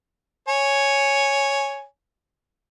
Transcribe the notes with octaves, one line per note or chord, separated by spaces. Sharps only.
C#5 G#5